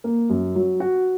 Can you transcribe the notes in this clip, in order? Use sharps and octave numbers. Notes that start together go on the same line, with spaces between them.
A#3
F#2
F#3
F#4